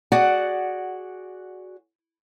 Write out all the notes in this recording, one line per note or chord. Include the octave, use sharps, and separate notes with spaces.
F#4 G#4 D5 F#5